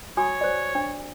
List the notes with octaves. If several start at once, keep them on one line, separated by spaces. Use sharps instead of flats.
F#4 C#5 G#5 D#6
C5 D5
D4